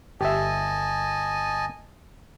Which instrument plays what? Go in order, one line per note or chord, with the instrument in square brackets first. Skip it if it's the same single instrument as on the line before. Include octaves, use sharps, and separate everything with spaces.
[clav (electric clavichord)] G1 [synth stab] G4 E5 [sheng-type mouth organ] D#5 G#5 A5